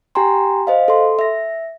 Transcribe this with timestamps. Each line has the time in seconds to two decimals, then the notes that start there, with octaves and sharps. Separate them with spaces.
0.15 G4 G5 G#5 A#5 C6
0.67 C5 D#5 F5
0.88 A4 C6
1.19 E5 A#6